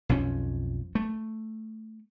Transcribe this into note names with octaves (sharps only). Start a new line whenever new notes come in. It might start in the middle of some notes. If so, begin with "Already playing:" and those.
B1 F2 F3 C#4
A3